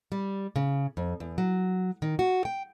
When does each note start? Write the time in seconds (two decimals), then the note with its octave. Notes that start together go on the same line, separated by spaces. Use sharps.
0.12 G3
0.56 C#3
0.97 F2
1.20 E2
1.38 F#3
2.02 D#3
2.19 F#4
2.45 G5